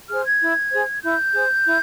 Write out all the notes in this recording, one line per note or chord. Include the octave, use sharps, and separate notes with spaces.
G#4 C5 F6
G#6
E4
G#4 C5
E4 G6
G#4 C5
E4